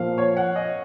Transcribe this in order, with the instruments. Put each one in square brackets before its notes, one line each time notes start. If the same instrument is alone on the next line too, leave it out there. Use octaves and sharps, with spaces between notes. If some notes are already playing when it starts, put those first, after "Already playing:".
Already playing: [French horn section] A#2 F3 A#3 [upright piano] F5
[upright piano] C#5
F#5
D#5